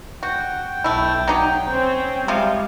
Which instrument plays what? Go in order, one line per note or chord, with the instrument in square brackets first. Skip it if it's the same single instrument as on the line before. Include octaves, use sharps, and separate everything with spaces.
[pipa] F#4 [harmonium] G5
[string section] B1 [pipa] A3 E4
[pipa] F#3 D#4 G4
[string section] C4 C#4
[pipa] C3 F3 F4 [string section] G3 G#3